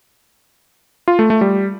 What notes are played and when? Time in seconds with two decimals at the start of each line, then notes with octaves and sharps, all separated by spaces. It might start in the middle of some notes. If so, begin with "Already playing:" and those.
1.08 F4
1.19 A3
1.30 A3
1.41 G3